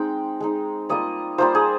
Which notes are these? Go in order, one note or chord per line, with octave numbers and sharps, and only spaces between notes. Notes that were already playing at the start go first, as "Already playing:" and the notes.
Already playing: G#3 C4 D#4 G5
G#3 C4 D#4
G3 A#3 F4 D#5
G3 A#3 F4 C5
G#4